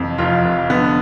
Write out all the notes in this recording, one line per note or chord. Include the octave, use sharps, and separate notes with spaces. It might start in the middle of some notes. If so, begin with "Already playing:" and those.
Already playing: F1 F2 E3
F1 F4
F1
D3 B3